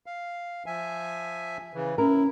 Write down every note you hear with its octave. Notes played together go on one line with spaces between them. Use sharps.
F5
F3 E5 G#5
C#3 E3
C#4 E4 A#4